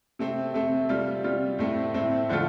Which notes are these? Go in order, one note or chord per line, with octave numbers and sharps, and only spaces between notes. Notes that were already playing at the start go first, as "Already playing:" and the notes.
C3 A3 C4
C3 A3 C4
C3 G3 F4
C3 G3 F4
A2 A3 C4
A2 A3 C4
D3 F3 A3 F4